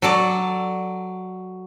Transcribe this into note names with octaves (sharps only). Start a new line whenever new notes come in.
F#3 A4 D5